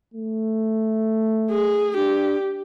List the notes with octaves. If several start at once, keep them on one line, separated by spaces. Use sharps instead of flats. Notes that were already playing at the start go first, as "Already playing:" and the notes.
A3
G#4
D4 G4